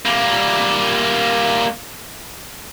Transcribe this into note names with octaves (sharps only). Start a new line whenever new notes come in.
G3 A#3